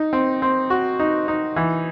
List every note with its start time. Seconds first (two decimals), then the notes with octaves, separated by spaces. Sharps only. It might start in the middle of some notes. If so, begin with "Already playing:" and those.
Already playing: D#4
0.13 C4
0.42 C4
0.70 F#4
0.99 D#4
1.28 D#4
1.56 E3